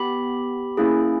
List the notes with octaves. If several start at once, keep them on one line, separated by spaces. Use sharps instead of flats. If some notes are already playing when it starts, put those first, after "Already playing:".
Already playing: B3 G4 B5
A#3 C#4 E4 G#4